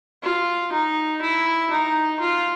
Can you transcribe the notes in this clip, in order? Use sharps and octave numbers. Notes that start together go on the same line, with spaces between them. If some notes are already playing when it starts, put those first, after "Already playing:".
F4
D#4
E4
D#4
F4